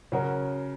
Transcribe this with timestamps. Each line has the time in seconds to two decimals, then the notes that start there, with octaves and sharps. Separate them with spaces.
0.12 C#3 F#3 C#4 F#4 A#4